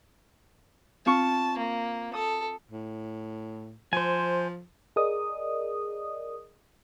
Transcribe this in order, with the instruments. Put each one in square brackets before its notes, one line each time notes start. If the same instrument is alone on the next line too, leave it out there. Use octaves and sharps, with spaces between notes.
[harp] C4 F4 C#6 [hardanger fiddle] A5
[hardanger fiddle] A#3
[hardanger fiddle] A4 [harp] D#6
[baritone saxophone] A2
[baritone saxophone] F3 [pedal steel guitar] C5 G#5
[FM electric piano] G#4 A#4 D5 D#5 D#6